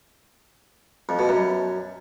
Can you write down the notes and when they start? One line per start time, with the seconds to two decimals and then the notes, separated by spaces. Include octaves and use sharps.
1.09 F2
1.19 B2
1.29 F#2